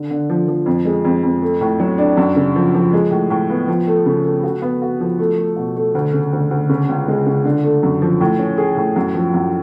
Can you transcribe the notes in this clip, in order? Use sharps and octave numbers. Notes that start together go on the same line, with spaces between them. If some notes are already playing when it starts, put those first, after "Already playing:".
Already playing: D3
D3
F3
F3
F2
G#3
F2
F2
A3
A2
F#3
D4
F#2
C#3
F3
F3
G#3
A2
A2
B3
F3
A3
C#3
A3
F#4
B3
F#4
F3
A3
A3
B2
A3
D2
C#3
D2
D2
C#3
C#2
G#3
C#3
D3
A3
F#2
F3
A2
C#4
G#4
A2
F#2
F3
F#2